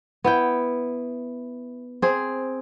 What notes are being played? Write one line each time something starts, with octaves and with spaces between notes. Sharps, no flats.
B3 E4 G5
C4 G#4